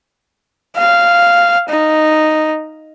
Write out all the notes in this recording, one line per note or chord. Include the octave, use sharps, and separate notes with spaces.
F5
D#4